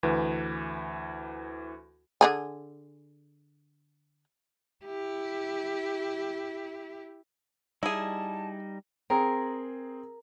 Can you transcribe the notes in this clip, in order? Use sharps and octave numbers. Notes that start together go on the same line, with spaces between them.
D2 E3 B4
D3 G#4 G#5
E4 G4
G3 D#4 E4 G#4 A5
C4 G#4 A#4